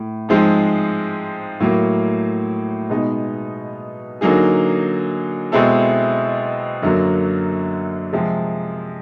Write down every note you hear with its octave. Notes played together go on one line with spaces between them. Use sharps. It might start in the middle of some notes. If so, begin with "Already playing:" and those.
Already playing: A2
G#2 F3 G#3 C4 D#4
A2 F#3 A#3
B2 G#3 B3 D#4
D3 F#3 A#3 D#4 G#4
B2 G#3 C4 E4 A4
F#2 D3 F#3 A#3
C3 F3 G#3